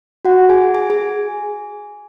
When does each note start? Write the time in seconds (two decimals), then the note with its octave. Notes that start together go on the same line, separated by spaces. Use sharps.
0.25 F#4 F#5
0.49 G#4 G#5
0.74 G#4 G#5
0.90 G#4 G#5